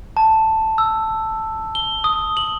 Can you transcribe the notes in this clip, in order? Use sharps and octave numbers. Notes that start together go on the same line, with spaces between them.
A5
E6
G7
D#6
F#7